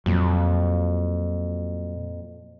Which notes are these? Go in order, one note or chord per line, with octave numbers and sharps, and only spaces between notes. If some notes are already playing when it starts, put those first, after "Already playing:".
F2 A#2 F#3